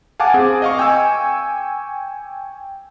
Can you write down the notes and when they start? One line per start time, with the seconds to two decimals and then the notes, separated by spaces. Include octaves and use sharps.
0.20 F5 F#5 G#5 A5 D6
0.34 C4 G#4
0.62 D#5 F5 C#6
0.79 G5 G#5 C#6 E6